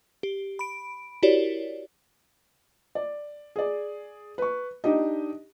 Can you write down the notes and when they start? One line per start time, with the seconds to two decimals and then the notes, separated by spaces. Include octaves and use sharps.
0.23 G4
0.59 B5 D7
1.23 E4 F#4 G4 A#4 C#5 D5
2.95 D5
3.56 G#4 D5
4.38 B4 C#6
4.84 D4 D#4 G4 D#5